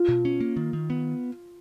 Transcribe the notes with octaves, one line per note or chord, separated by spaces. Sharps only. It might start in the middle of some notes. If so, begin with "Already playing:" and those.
Already playing: F4
B2
C#4
A#3
D#3
D#3
B3